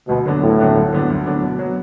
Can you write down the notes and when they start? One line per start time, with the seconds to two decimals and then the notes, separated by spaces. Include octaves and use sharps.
0.08 D2 B2
0.26 D3 F#3 B3 D4
0.42 D2 A2
0.58 D3 F#3 B3 D4
0.76 D2
0.93 D3 F#3 B3 D4
1.10 D2
1.26 D3 F#3 B3 D4
1.43 B2
1.59 F#3 B3